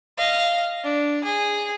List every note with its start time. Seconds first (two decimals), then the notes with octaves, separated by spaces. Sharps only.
0.17 D#5 F5
0.84 D4
1.24 G#4